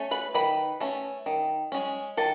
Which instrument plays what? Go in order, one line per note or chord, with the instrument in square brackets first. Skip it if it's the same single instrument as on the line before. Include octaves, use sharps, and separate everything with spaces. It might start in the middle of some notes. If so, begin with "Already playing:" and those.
Already playing: [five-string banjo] A3 C#4
B4 B5
D#3 B4 B5
A3 C#4
D#3
G#3 C#4
D#3 A4 A5